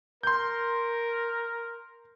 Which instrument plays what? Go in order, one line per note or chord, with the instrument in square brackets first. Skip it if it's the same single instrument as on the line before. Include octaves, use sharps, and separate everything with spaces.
[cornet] A#4 [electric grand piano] C6 G6